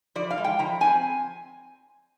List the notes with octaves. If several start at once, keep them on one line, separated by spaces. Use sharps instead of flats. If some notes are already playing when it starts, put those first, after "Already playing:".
F3 D5
F5
G#3
G5
F3 A#5
C4 G#5